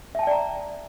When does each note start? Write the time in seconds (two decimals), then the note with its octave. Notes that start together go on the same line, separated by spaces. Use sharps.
0.15 E5
0.19 A5
0.23 G5
0.27 D5
0.31 A#5